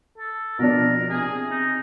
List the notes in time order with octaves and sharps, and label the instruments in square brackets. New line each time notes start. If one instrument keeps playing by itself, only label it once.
[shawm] A4
[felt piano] B2 F3 D4 [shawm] A#4
[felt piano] C3 [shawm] G#4
[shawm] D#4